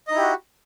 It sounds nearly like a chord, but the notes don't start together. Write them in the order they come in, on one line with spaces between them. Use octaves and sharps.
D#5 D#4 E4 G4 F#4